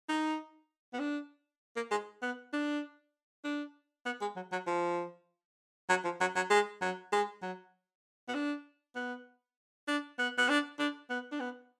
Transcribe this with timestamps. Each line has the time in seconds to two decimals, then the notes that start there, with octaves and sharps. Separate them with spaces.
0.09 D#4
0.94 B3
0.99 D4
1.76 A#3
1.91 G#3
2.22 B3
2.53 D4
3.44 D4
4.06 B3
4.21 G#3
4.36 F#3
4.52 F#3
4.67 F3
5.90 F#3
6.04 F3
6.21 F#3
6.36 F#3
6.50 G#3
6.81 F#3
7.12 G#3
7.42 F#3
8.29 B3
8.35 D4
8.95 B3
9.88 D4
10.19 B3
10.38 B3
10.49 D4
10.79 D4
11.10 B3
11.32 D4
11.40 B3